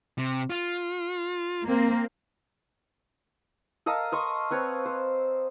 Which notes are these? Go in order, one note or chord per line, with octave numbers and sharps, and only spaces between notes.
C3
F4
A#3 C4
A4 A#4 D#5 F5
D#5 C6 C#6
C4 B4 C#5
C5